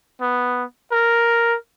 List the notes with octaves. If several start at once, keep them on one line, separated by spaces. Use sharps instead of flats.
B3
A#4